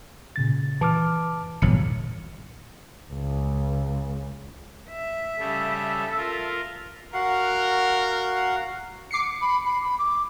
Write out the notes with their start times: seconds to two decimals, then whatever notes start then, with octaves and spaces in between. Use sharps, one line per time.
0.36 A#2 C#3 A6
0.81 E3 A5 D6 F6
1.62 G1 E2 A#2 F#3 C#7
3.12 C#2
4.90 E5
5.40 C#3 G3 A4
6.17 F4 A#4
7.14 F#4 A#4 F5 F#5
9.11 D6 C7 C#7
9.42 B5
9.65 B5
9.83 B5
9.99 D6